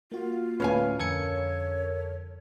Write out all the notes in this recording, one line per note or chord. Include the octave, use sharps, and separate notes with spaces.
A#3 F4 F#4
D2 A2 C#4 B4 F5 G#5
F2 D3 A4 A#4 C#5 G#6 C#7